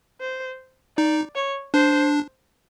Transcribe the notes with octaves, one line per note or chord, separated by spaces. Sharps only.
C5
D#4 D5
C#5
D4 C5